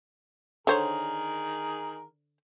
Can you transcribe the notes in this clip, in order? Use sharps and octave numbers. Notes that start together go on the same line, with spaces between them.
D3 D#3 G#4 A#4 C5 C#5